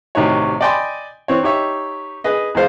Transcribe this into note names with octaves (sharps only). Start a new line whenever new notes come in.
A1 C3 D#3 D#4 F#4 C#5
D5 D#5 G5 G#5 B5 C6
E3 C4 C#5
D#4 G4 C#5 E5
G#4 B4 D#5
E2 G#3 C5 F5